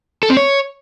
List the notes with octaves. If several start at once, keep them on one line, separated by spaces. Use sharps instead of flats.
A4
C4
C#5